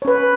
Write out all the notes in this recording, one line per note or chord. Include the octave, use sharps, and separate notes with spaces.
C#4 B4 C#5